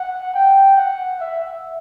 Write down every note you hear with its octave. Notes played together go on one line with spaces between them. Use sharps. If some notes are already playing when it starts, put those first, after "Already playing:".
Already playing: F#5
G5
F#5
E5